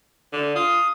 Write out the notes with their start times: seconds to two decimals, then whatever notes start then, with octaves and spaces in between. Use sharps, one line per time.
0.33 D3
0.55 F4 D#6